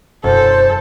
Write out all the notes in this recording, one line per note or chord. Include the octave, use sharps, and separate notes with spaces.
E1 F#2 A4 C5